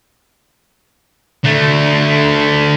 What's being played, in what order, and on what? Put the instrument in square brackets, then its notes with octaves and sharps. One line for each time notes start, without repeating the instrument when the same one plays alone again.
[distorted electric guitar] D3 A3